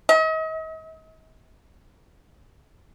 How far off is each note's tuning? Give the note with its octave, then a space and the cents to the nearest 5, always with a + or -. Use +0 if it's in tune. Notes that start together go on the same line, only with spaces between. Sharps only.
D#5 +40